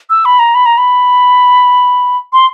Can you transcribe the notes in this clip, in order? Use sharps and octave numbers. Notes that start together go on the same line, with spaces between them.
E6
B5
A#5
B5
A#5
B5
C6